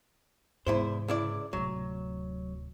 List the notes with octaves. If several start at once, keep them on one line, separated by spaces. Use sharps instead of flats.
E2 G#2 C3 E4 C5
C#2 E4 D5
D1 C3 F#3